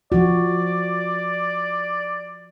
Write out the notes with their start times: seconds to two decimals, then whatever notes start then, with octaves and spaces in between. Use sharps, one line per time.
0.12 F3 F#4 D5